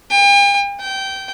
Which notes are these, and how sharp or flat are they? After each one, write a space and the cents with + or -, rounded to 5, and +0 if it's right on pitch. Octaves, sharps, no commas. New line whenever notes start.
G5 +45
G5 -20